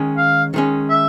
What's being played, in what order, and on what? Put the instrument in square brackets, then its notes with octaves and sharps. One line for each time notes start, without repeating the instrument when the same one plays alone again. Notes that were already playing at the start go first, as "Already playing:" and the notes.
Already playing: [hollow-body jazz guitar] D#3 G#3 C#4
[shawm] F5
[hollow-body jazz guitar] D#3 G#3 C#4
[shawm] E5